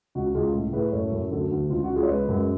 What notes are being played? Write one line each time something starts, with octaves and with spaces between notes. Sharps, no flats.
C#2 F#4
C#2 F4 G#4
A2
A2 G#4 B4
F#2 A4 C#5
F#2
D2 F#4 A4
D2 F#4
C#2 F4
F#4
C#2
F4 G#4
C#5
G#3 G#4 B4
F#2